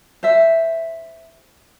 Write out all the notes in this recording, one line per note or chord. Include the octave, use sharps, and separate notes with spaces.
C5 E5